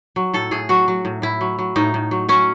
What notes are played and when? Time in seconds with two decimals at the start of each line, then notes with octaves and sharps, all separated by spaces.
0.16 F#3
0.34 A2 A4
0.51 A2 G#4
0.69 F#3 F#4
0.88 F#3
1.05 A2
1.22 A2 E4
1.41 F#3
1.59 F#3
1.76 A2 D#4
1.94 A2
2.11 F#3
2.29 F#3 C#4